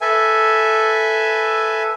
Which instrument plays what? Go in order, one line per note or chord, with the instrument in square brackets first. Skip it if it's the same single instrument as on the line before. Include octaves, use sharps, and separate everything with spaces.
[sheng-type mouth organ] A4 B4 E5 G#5